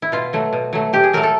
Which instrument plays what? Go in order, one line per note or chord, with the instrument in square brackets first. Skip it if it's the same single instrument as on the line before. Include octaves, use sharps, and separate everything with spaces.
[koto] E4
B2 F4
F#3 A3
B2
F#3 A3
A#2 G4
G#4
F#3 A3 A#4
A4